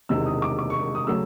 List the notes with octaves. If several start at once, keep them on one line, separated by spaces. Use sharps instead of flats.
E1 E2 C3 D#3 E6
D#6
D6
D6
C#6
C#6
D#6
C#3 F#3 A3 C#4 E6